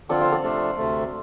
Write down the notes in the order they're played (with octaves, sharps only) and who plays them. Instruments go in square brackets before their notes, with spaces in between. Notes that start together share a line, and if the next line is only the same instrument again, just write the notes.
[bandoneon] D3 F3 C4 F4 [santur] A4 D5
[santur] C5 F5
A4 D5
[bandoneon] C3 F3 A3 D4
D2 C3 A3